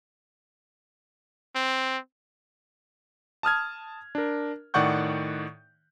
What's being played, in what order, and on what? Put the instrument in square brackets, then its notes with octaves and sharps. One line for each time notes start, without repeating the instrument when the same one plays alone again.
[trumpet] C4
[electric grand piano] A5 D#6 F6 G#6
D4 A#4
A2 D#3 D5 F#5 C#6 G6